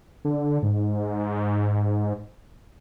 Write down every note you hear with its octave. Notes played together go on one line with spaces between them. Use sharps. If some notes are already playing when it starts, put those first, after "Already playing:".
D3
G#2